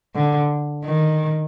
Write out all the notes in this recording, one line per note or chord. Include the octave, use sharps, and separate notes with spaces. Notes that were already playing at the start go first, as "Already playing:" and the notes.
D3
D#3